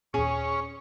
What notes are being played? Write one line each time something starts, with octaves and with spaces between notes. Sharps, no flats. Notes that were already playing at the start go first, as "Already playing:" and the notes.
D#2 A#2 C#4 G#4 C#6